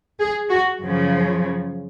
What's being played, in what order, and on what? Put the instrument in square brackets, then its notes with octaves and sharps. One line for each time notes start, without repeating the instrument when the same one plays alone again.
[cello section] G#4
F#4
F#2 C#3 F3